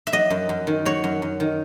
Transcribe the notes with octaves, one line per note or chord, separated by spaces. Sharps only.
E5
F#3 D#5
F#2
F#2
D#3
F#3 C#5
F#2
F#2
D#3